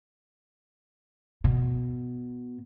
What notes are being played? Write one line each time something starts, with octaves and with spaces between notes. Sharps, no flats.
B2